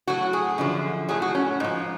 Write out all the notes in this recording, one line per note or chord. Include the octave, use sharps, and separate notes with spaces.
A2 F#3 F#4
G#4
F#2 D3 F3
A2 F#3 G#4
F#4
C#4
G#2 F3